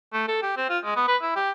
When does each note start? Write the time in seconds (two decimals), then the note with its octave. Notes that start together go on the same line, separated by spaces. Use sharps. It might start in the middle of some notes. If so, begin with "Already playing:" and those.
0.13 A3
0.28 A4
0.42 G4
0.57 C4
0.69 F4
0.84 G#3
0.96 B3
1.08 B4
1.22 E4
1.36 G4